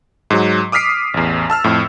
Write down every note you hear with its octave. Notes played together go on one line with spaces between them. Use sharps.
G#2 F#3
D6 D#6 F6 B6 C7 D7
A1 E2
A5 E6 F6
F2 A2